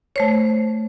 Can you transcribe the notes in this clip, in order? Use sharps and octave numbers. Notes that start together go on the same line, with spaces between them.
A3 C5 C#5